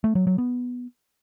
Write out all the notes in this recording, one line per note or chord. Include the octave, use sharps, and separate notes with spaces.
A3
F#3
F#3
B3